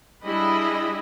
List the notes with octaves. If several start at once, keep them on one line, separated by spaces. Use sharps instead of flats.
G3 D4 E4 G#4 D#5 B5